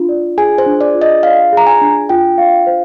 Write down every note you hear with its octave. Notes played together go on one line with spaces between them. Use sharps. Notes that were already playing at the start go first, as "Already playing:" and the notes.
Already playing: D4 F4
D5
G#4 G#5
C5
D4
D5
F4
D#5
D5 F5
G#4
A#5
G#5
D4
F4 G5
F5
C5